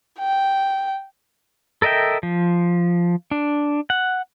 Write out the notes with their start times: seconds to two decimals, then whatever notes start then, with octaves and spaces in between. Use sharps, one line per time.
0.19 G5
1.82 A4 A#4 D#5 E5 G5
2.23 F3
3.31 D4
3.90 F#5